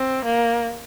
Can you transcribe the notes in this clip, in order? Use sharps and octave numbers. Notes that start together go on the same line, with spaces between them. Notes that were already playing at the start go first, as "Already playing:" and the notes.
Already playing: C4
A#3